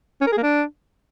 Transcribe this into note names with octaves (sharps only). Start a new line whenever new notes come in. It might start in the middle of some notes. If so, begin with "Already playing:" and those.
C#4
A#4
G#4
A#3
D4